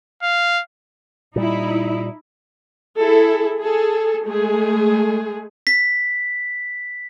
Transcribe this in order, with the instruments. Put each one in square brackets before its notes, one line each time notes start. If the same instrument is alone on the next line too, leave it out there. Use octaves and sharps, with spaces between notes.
[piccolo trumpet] F5
[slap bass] A#2 G3 [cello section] D#4 E4
[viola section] E4 G#4 A4
G#4 A4
G#3 A3 G#4
[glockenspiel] B6